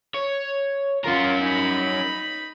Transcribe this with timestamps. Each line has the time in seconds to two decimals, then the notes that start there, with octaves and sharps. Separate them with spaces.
0.14 C#5
1.04 C#4 F4 A#4
1.41 D#4 B5